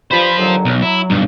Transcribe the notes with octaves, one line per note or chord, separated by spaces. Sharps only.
G2 F3 F4 C5 B5
D#2 D3 F#3
B1
F#3 E4
B1 G2